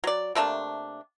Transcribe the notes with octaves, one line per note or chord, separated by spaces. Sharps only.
F#3 D5
C3 A3 A#3 D4